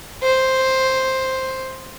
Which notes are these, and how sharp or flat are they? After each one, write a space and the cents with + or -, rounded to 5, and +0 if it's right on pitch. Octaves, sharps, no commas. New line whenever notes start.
C5 +5